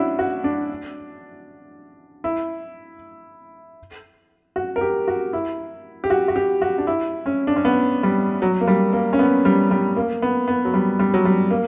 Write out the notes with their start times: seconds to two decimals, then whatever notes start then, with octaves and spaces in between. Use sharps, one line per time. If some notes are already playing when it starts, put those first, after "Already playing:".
Already playing: C#4 D4 E4 F#4
0.19 F#4
0.44 D4
2.24 E4
4.56 F#4
4.76 A#4
4.81 G4
5.08 F#4
5.33 E4
6.04 G4
6.10 F#4
6.28 F#4
6.36 G4
6.62 F#4
6.78 D4
6.87 E4
7.26 C#4
7.47 D4
7.56 C#4
7.65 B3
8.03 G3
8.42 F#3
8.61 A#3
8.68 G3
8.93 A#3
9.13 C#4
9.19 B3
9.45 G3
9.71 G3
9.97 A#3
10.22 B3
10.48 B3
10.65 F#3
10.74 G3
10.99 G3
11.14 F#3
11.25 G3
11.51 A#3